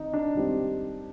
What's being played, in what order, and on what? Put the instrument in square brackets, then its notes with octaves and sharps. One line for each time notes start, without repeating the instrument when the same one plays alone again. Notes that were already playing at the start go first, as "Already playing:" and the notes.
Already playing: [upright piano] D#3 C4 [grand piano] D#4
[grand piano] D4
[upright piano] D#3 G3 C4 G4